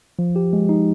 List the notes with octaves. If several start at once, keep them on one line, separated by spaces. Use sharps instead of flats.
F3
G4
G#3
D#4